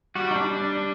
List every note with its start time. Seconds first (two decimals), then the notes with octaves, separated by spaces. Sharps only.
0.15 G3 F#4
0.31 D#4
0.36 D4
0.57 D4
0.77 D4